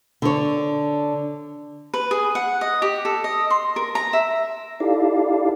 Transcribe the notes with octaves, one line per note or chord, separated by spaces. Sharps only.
D3 C#5
B4
G#4
F#5
D#5
G4
A4
D#5
C6
A#4
A#5
E5
D#4 E4 G4 A4 D5 F5